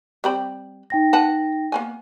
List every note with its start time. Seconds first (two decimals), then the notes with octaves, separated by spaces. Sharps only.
0.24 G3 C4 B5
0.90 D#4 G5 A#6
1.13 B4 F#5 A5
1.72 A#3 B3 G#5